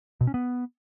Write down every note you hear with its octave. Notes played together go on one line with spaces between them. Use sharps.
B2
C#4
B3